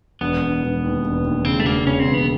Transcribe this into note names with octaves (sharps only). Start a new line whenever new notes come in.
E1 B3
E1
E1
D#2
E1
D#2
C#3 C4
A3
E1 A#3
C#3 C#4
C4
E1
B3